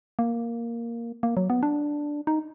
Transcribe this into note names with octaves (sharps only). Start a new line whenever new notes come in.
A#3
A#3
F#3
B3
D4
D#4